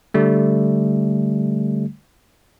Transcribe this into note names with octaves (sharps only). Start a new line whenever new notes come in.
D3 G3 A3